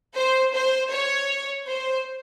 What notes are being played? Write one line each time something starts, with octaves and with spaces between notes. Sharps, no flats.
C5
C5
C#5
C5